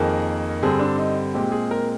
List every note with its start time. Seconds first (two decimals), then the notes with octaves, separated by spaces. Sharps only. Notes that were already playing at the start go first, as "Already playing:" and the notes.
Already playing: F2 D#3 A#3 G#4
0.62 G2 D3 G3 C4 G#4
0.80 D4
0.98 D#4
1.34 A#2 G#3 C4 G4
1.52 G#4
1.71 A#4